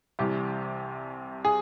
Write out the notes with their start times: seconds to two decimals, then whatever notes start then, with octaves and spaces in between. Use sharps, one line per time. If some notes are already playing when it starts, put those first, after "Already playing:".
0.19 C2 C3 E3 G3 G4
1.45 G#4